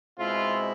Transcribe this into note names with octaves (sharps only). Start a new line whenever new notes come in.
B2 G#3 C4 E4 F4